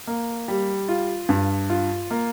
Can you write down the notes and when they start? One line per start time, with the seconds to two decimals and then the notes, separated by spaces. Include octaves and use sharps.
0.07 A#3
0.48 G3
0.89 F4
1.29 G2
1.70 F4
2.11 A#3